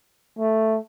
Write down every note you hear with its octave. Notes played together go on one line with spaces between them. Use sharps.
A3